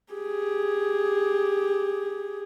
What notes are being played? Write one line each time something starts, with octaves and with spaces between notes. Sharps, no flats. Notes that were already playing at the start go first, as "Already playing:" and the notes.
G4 G#4